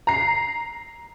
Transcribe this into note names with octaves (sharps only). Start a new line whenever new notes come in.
A#5 C7